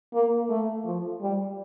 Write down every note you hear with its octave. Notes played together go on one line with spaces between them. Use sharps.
A#3
A3
F3
G3